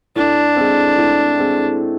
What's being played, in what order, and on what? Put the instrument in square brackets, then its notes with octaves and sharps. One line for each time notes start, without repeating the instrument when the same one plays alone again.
[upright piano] A2 [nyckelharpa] D4
[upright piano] G#3 C4
A2
G#3 C4